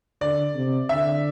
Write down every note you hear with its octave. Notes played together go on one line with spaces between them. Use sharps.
D3 D5
C3
D3 E5